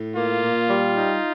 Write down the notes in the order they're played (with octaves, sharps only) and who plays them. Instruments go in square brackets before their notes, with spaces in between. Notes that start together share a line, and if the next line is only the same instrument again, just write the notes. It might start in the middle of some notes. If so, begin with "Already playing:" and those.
Already playing: [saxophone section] A2
[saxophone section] A#3 [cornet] F4
[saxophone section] A#2
G3
D#4